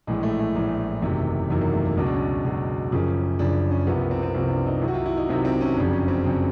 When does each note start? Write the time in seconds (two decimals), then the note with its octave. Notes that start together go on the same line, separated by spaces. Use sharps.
0.07 A#1 A2 E3 G#3
0.23 A3
0.39 A3
0.55 A#1 A2 E3
1.02 F#1 E2 C3 D#3 F#3
1.49 F#1 E2 C3 D#3 F#3
1.61 A#3
1.73 A3
1.85 A#3
1.97 C#2 B2 F#3 C#4
2.06 D4
2.14 C#4
2.44 C#2 B2 F#3
2.92 F#1 F#2 C#3 F3
3.39 F#1 F#2 C#3 F3 D4
3.71 C#4
3.87 C2 C3 F3 B3
3.99 A#3
4.11 C4
4.23 C4
4.34 C2 C3 F3
4.50 D4
4.66 D#4
4.82 C2 C3 D#3 F#3 E4
4.88 F#4
4.94 F4
5.06 E4
5.17 D#4
5.29 C2 C3 D#3 F#3 C4
5.45 C4
5.61 C#4
5.77 F#1 F2 C#3 F#3 D4
5.93 C#4
6.08 C4
6.24 F2 C#3 F#3 C#4